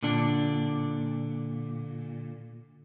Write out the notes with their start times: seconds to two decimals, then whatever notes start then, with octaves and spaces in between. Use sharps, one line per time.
0.03 A#2 D3 D4